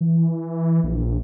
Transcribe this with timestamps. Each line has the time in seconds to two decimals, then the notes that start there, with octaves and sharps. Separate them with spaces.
0.01 E3
0.84 A#1